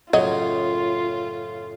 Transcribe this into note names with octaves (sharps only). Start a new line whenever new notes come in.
F#2 A2 C#3 F#3 F4 D#5